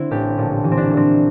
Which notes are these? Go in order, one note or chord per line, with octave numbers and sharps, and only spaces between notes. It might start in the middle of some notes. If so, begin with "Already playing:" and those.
Already playing: D3 C4 E4
A1 G4
A#1
E3
C4
D4
A#1
C4